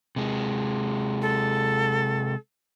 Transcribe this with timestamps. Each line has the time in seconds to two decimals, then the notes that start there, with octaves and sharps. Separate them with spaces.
0.16 C3 G#3
1.22 A4